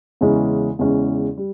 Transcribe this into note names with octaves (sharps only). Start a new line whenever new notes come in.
E2 C#3 E3 G#3 C#4
E2 C#3 E3 G#3 C#4
G3